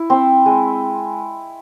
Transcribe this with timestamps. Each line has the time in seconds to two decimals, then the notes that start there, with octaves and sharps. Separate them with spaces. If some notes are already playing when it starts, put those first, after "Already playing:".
Already playing: E4
0.10 C4
0.46 G#3